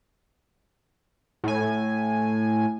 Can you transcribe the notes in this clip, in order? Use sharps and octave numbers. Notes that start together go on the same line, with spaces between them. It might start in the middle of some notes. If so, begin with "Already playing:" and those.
A2 G#5